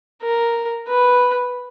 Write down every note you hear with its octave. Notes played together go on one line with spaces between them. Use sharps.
A#4
B4